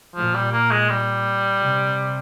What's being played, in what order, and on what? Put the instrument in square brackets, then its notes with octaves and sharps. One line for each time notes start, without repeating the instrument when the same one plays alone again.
[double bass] A#2 [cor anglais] F3
[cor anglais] G3
A#3
G#3
G3
[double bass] C3